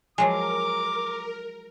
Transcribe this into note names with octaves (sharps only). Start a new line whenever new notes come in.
F3 F#3 G#3 A#4 G#5 D6